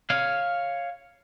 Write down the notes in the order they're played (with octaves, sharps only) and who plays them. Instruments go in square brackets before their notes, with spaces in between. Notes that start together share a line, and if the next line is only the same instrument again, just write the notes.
[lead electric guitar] C#5 F5